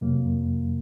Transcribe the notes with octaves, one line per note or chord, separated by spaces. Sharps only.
F2 C3 F#3 A#3